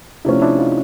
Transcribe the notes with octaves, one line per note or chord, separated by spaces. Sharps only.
C3 F3 A3 C#4 D4 E4
D4 E4
D#4 F4